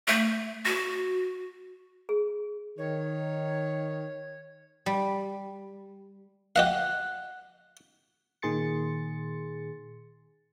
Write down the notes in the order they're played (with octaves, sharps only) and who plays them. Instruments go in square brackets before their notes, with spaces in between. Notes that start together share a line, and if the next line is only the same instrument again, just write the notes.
[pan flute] A3
F#4
[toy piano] G#4
[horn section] D#3 [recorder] C#5
[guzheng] G3
[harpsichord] G4 D#5 F5 [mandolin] F#5
[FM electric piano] A#2 D#3 G#4 C6 A6 C#7